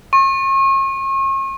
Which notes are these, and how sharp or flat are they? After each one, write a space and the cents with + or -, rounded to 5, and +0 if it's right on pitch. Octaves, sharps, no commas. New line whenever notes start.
C#6 -40